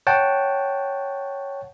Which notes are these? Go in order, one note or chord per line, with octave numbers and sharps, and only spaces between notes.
C#5 F#5 G5 A5